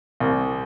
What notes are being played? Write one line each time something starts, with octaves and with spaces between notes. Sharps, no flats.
C2